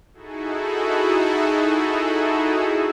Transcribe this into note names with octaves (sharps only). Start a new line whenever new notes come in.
D#4 E4 F#4 G#4 A4